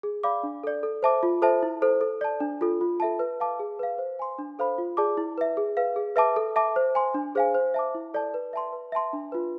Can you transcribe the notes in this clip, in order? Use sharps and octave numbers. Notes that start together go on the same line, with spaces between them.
G#4
D5 F5 B5 D6
D4
A4 D5
A4
C5 E5 A5 D6
F4
A4 C5 E5 A5
E4
A4 C5
A4
D5 A5
D4
F4 A4
F4
A4 E5 A5
B4
F5 A5 D6
G#4
B4 F5
C5
G#5 C6
D4
A4 C5 F5 B5
F4
G#4 D5 A5 D6
E4
B4 E5
G#4
B4 F5
G#4
B4 E5 A5 D6
A4
E5 A5 D6
C5
G#5 C6
D4
G#4 C5 F5 G#5
C5
E5 A5 D6
E4
A4 D5 A5
B4
E5 A5 C6
B4
E5 A5 C6
D4
F4 B4